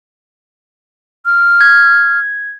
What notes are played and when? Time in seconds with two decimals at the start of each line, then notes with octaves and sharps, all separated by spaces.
1.26 F6
1.61 G#6